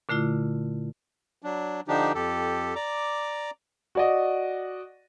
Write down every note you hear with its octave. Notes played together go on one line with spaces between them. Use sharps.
A#2 D3 A3 E4 F4
F#3 D4
D3 F3 D4 D#4 G4
F2 G4 A4
D5 A#5 D6
F#4 D5 D#5